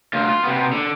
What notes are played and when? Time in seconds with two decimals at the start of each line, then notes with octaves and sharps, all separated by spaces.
0.13 D2 F4
0.29 F4
0.44 C3 B3
0.73 D3